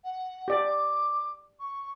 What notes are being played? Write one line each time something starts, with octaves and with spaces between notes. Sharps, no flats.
F#5
G4 D5
D6
C#6